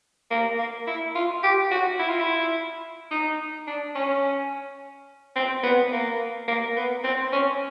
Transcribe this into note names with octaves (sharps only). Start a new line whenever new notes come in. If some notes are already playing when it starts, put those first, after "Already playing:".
A#3
A#3
E4
F4
G4
F#4
E4
F4
E4
D#4
D4
C#4
C4
B3
A#3
A#3
B3
C4
C#4